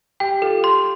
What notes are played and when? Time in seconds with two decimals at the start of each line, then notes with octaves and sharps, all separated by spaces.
0.20 G4 G5
0.42 F4 A4
0.64 C6